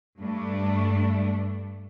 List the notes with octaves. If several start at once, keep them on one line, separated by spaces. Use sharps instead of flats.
G2 A3 D4